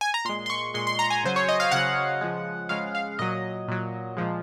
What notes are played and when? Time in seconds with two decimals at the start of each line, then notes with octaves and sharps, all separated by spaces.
0.01 G#5
0.14 A#5
0.25 A#2 G#3 C6
0.46 C6
0.50 C#6
0.74 A#2 G#3 C6
0.87 C6
0.99 A#5
1.10 G#5
1.24 C#3 F#3 C5
1.36 C#5
1.49 D#5
1.60 F5
1.72 C#3 F#3 F#5
2.21 C#3 F3 G#3
2.69 C#3 F3 G#3 F5
2.95 F5
3.19 A#2 F#3 D#5
3.68 A#2 F#3
4.17 A#2 F3 G#3